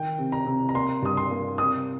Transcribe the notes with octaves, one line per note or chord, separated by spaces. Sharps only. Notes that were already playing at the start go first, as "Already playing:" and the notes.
Already playing: D#3 G5
C3
A#5
C3
A#5
A#3 C6
G2 D#6
C6
A#3
C3 D#6